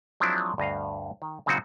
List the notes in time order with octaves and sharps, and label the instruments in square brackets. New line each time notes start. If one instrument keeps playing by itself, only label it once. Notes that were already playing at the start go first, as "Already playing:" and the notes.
[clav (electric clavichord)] F3 F#3 G#3 C4 D4 E4
D2 G2 D#5 F5
D#3
A#2 C#3 F#3 C4 D#4 F#4